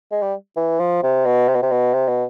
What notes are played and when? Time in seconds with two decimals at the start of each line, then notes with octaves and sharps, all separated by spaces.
0.12 G#3
0.22 G3
0.57 E3
0.80 F3
1.03 C3
1.25 B2
1.48 C3
1.55 B2
1.62 C3
1.71 B2
1.94 C3
2.08 B2